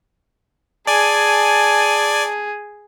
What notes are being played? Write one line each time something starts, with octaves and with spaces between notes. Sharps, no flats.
G#4 D5 G#5 A5